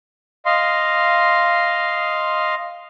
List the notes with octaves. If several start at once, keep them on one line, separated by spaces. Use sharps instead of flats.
D#5 F5 C6